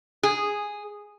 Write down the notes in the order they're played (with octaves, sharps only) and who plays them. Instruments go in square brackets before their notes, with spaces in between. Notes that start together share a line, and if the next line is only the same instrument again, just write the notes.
[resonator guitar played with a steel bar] G#4